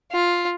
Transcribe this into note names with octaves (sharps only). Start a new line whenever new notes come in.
F4